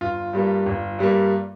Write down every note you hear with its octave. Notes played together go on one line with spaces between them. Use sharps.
G1 F4
G2 G3 A#3
G1
G2 G3 A#3